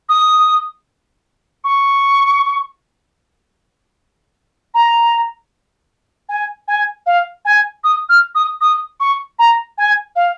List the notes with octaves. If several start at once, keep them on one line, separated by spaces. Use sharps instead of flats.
D#6
C#6
A#5
G#5
G#5
F5
G#5
D#6
F6
D#6
D#6
C#6
A#5
G#5
F5